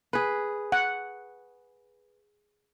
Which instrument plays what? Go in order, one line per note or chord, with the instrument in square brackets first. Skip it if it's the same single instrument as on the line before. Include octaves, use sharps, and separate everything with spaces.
[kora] G#4 B4
[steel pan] F#5